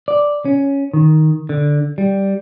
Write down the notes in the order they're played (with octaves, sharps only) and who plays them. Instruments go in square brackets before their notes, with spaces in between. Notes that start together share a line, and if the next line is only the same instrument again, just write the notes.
[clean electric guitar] D5
C#4
D#3
D3
G3